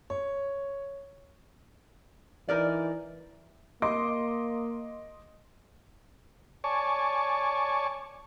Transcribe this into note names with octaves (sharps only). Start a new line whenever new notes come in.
C#5
E3 D#4 A#4 D5
A#3 D#5 C6 D6
C#5 D5 G#5 A5 C#6